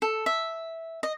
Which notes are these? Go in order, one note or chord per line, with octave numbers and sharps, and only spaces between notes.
A4
E5
D#5